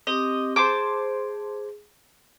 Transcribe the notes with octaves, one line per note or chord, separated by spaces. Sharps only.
C4 G4 D#5 D6
G#4 C5 A5 D6